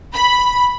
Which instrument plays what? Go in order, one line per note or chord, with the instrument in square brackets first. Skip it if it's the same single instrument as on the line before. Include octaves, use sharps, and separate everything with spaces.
[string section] B5